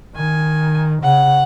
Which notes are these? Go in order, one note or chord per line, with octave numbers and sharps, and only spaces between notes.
D#3 G#5
C#3 F#5